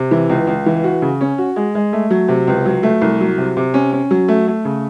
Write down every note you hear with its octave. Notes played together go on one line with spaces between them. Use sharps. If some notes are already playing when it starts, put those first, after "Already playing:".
Already playing: C3
E3
C#2
C#2
E3
F#4
C#3
C#4
F#4
G#3
G#3
A3
F#3
C3
C#2
F#3
A3
C2
F#3
C3
C3
C#4
C#4
F#3
A3
A3
C#3